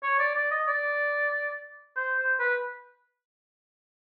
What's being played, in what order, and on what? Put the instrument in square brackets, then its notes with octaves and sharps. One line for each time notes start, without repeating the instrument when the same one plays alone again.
[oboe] C#5
D5
D5
D#5
D5
C5
C5
B4